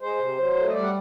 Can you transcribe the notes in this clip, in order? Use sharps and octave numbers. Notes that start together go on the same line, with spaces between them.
G#3 C5
C3
F#3
A3
D#5
G3 D5
F#5